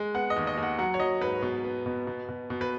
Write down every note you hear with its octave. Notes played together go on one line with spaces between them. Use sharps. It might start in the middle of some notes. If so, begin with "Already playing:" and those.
Already playing: G#3
B3 F#5
D#5
D#2
D#5
D#2
F#5
F#3 F#5
C#5
F#3 D#5
G#2 B4
B2
B3
B2
B2
B2
B2
B4